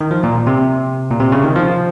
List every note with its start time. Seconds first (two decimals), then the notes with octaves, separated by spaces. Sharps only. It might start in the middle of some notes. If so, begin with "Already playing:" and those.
0.01 D#3
0.11 F3
0.23 A#2
0.47 C3
1.11 A#2
1.20 C3
1.32 C#3
1.44 D#3
1.56 F3